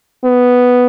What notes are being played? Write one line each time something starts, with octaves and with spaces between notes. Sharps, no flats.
B3